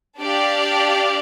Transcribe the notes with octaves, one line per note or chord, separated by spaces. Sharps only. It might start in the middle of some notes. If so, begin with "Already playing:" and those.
D4 G4 D5 F5